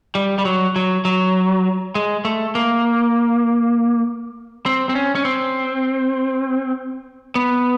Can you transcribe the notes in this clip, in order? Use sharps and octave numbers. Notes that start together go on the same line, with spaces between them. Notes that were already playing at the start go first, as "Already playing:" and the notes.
G3
G3
F#3
F#3
F#3
G#3
A3
A#3
C4
C4
C#4
C#4
C4
B3